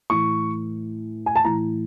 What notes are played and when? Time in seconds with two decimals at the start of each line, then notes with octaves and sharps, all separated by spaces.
0.10 A2 E3 C#6
1.26 G#5
1.36 A5
1.44 A2 E3 A#5